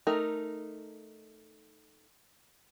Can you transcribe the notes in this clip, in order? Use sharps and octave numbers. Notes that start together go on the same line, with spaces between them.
A3 D#4 A#4